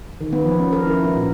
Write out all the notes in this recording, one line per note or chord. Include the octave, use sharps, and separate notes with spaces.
D#3
B3
F3
C#4
A#4
E4
B3
A#2